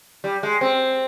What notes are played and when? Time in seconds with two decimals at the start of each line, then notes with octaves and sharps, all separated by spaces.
0.24 G3
0.43 G#3
0.61 C4